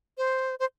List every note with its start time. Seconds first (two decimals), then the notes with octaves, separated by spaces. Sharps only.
0.18 C5
0.60 C5